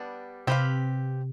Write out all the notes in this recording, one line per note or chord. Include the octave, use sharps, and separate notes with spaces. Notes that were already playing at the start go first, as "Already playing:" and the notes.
Already playing: G3 B3 D4
C3 C4 G4 B4 F5